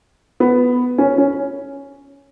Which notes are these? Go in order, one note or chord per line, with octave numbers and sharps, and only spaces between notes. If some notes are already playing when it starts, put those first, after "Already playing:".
B3
C#4
C#4